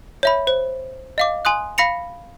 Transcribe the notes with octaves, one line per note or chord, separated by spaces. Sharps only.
C#5 E5 B5
C5
D#5 F5 D6
G#5 C6 D#6 F#6
F5 B5 A#6 C#7 F7